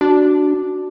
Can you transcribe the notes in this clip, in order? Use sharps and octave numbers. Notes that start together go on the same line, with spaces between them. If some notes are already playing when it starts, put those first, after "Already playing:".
D4 F#4